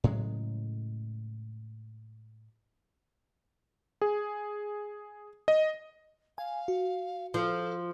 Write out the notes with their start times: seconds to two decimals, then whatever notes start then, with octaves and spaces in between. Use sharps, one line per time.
0.04 A2 C#3 F#3 G#3
4.02 G#4
5.48 D#5
6.38 F5 G#5
6.68 F#4
7.34 F3 A4